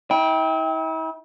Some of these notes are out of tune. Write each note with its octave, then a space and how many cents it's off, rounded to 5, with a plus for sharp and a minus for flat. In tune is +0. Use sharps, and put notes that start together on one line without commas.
E4 -40 G5 +0